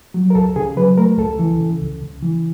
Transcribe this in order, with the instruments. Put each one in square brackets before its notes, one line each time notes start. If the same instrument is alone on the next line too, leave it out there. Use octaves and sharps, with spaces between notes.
[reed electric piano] F#3
A#4
C#2 A4
C#3 G#4
F#3 B4
A3 A#4
C#2 A4
E3
C#3
C#2
C#3
E3